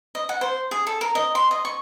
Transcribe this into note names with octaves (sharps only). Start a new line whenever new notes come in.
D#5
F#5
C5
G#4
A4
A#4
D#5
C6
D#5
C#6